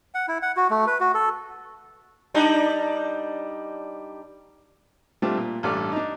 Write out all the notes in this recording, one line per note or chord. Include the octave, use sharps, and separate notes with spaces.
F#5
E4
F#5
F#4
A3
B4
F#4
A4
G3 D4 D#4
G3 A3 C4 D4 F4
A#2
A1 G2 A4 D5 F6
D4 D#4